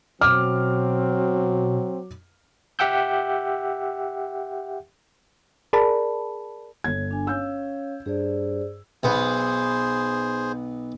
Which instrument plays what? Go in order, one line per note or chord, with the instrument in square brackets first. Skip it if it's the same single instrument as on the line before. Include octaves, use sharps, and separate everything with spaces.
[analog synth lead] B2 [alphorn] F#3 [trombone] C4 [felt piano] D6 F6
[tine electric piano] G4 E5 F#5 G5 E6 G6
[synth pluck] G#4 A#4 D5 A5 B5
[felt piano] G1 G#6 [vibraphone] C#5
[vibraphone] D4 G#5
[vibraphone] C#4 C#5 F5 [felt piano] E6 G6
[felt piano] G2 [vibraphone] G#4 C5 D5
[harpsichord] B1 B3 [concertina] G#4 C5